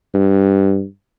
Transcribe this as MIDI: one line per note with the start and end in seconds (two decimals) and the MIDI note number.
0.14 0.84 43